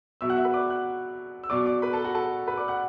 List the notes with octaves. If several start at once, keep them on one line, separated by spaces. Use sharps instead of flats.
B2 F#3 E5 E6
F#5 F#6
E5 E6
B4 B5
D5 D6
F#5 F#6
E6
B2 F#3 D5 D6
D5 D6
B4 B5
A4 A5
F#4 F#5
A4 A5
B4 B5
D5 D6
F#5 F#6